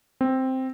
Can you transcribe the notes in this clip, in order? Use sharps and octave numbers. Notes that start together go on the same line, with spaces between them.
C4